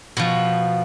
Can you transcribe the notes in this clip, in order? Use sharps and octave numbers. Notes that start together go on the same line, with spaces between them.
B2 F3